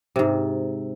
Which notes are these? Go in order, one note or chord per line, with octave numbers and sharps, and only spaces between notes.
G#2 C3